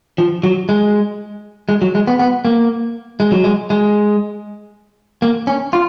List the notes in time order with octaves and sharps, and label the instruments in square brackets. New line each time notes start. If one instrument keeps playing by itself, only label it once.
[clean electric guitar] F3
F#3
G#3
G#3
F#3
G#3
B3
B3
A#3
G#3
F#3
G#3
G#3
A#3
C#4
F4